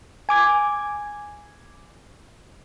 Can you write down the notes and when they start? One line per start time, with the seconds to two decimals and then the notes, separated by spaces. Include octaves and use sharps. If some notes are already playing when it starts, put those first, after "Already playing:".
0.29 G#5 D6 G#6